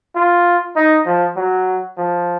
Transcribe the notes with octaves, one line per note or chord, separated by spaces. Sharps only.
F4
D#4
F3
F#3
F3